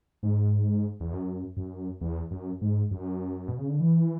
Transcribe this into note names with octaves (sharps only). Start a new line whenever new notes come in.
G#2
E2
F#2
F#2
E2
F#2
G#2
F#2
B2
C#3
D3
E3